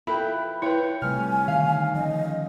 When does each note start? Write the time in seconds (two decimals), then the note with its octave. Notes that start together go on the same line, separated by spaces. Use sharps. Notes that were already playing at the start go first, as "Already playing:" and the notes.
0.07 E4 F4 A4 B4 G5 B5
0.62 E4 B4 C#5 G5
1.02 C3 G3 A3 G#5 F6
1.48 D3 D#3 F5
1.94 F3 C#4 D#5